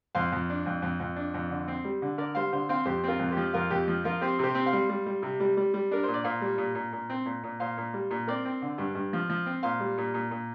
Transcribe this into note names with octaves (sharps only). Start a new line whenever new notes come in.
F2 C5 F5
F2
D4
F2
F2
F2
D4
F2
D3
C4
G3
D3
D3 A#4 D5
G3 C5 F5
D3 C5 F5
C4 C5 F5
F2 G4 C5
C4 F4 A#4
F2
G4 C5
F3
F2 F4 A#4
F2 G4
F3
F3 F4 A#4
C4 G4 C5
C3 G4 C5
C4
C5 F5
G3
G3
G3
C3
G3
G3
G3
D4 A#4
A#2 C5
D5
A#2 C5 F5
G3
A#2
A#2
A#2
C4
A#2
A#2
A#2 C5 F5
A#2
G3
A#2
C4 A#4 D5
C4
D3
G2
G2
F3
F3
C4
A#2 C5 F5
G3
A#2
A#2
A#2